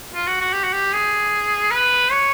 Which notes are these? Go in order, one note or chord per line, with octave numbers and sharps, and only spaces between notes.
F4
F#4
F#4
G4
F#4
G4
G#4
B4
C#5